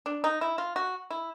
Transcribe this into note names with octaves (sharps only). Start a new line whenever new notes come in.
D4
D#4
E4
F4
F#4
E4